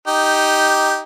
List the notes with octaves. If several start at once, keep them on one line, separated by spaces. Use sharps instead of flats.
D#4 G4